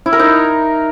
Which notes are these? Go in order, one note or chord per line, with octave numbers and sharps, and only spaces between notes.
E4
A#4
D#4